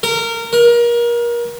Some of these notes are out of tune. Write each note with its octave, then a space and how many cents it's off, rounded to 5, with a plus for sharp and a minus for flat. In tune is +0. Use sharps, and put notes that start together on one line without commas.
A#4 -20
A#4 +30